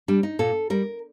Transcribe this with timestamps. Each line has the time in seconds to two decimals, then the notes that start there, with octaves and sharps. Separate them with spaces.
0.08 G3 D4
0.23 D#4
0.39 A#2 A4
0.70 G3 A#4